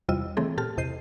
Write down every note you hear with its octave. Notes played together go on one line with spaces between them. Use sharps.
E2 C3 G3 F4 D#5 E6
C#3 E3 A3 C4 G#4 A4
A#2 G4 A4 A5 F6
E2 C3 D#5 G6 C7 D#7